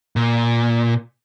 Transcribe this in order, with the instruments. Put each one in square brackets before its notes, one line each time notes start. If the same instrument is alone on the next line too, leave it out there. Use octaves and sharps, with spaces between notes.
[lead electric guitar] A#2